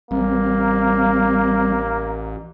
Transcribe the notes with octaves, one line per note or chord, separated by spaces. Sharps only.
A1 G3 A#3 C4